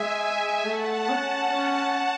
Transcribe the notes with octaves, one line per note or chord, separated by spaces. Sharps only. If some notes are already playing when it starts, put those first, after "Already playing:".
Already playing: G#3 E5 G#5
A3 F#5 A5
C#4
C#4